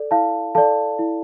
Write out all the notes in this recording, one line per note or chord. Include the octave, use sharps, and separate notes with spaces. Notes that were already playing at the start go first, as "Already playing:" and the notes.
Already playing: A4 D5
E4 F5 A5
A4 D5 F5 A5
E4